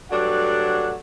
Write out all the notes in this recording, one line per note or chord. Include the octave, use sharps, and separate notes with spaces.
G2 F#3 A3 D4 D5 F#5